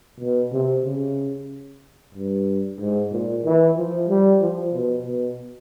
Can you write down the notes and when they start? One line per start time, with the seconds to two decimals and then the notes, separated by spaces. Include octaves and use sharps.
0.20 B2
0.52 C3
0.86 C#3
2.15 G2
2.79 G#2
3.12 A#2
3.45 E3
3.77 F3
4.09 G3
4.41 F3
4.74 B2
5.06 B2